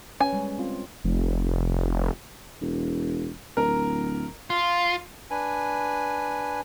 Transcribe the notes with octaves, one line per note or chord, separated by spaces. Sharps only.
C#4 B4 G#5
G3 G#3
C4 F4
F1
E1
D1 A#4
F4
D4 B4 G#5